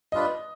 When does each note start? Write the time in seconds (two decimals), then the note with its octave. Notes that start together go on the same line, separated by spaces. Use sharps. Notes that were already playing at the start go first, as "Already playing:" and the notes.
0.12 G3 D4 F4 B4 D#5